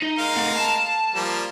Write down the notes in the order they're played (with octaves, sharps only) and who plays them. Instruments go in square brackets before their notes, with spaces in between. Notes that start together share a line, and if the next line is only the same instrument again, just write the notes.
[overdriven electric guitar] D#4
[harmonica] G#3 A#4 F5
[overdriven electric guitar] A3 C4
A5
[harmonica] F3 G3 A#3